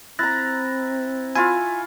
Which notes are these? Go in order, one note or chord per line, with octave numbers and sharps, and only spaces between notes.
C4 E4 A#5 F#6 A6 A#6
E4 F4 G#5 C#6